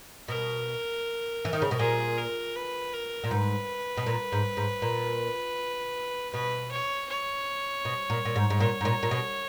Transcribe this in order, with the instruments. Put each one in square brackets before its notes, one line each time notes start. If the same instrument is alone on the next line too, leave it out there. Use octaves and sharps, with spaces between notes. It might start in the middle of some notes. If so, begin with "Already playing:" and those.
[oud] B2 [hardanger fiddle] A#4
[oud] E3
D#3
C#3
B2
[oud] A#2 [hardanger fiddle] G#4
[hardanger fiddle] A#4
B4
A#4
[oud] A#2
[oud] G#2 [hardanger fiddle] B4
[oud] B2
A#2
G#2
G#2
A#2
[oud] B2 [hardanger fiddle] B4
[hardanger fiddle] C#5
C#5
[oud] B2
A#2
A#2
G#2
G#2
[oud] A#2 [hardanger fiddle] C#5
[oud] G#2
A#2
A#2
B2